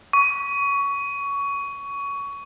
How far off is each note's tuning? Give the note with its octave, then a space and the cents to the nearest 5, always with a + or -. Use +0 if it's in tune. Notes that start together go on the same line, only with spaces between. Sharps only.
C#6 +20